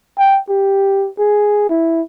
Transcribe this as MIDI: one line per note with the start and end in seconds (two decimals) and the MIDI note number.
0.19 0.40 79
0.49 1.09 67
1.19 1.66 68
1.69 2.01 64